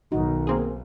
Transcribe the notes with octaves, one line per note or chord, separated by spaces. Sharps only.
B1 D#3 D#4 F#4
A#3 C4 G#4